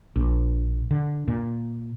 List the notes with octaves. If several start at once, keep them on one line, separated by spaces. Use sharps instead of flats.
A#1
D3
A#2